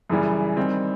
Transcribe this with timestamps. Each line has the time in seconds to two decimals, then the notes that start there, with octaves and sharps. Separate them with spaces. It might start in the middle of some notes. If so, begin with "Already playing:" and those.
0.10 F#2 C#3 E3 G3
0.57 D#3 G3 C4